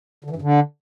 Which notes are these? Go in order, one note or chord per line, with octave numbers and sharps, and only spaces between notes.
D3
E3
G2
D3